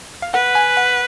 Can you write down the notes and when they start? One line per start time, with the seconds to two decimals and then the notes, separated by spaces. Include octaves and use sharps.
0.22 F5
0.34 B4 F#5
0.55 G#5
0.77 F#5